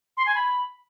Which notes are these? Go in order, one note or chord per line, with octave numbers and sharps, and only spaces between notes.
C6
G#5
B5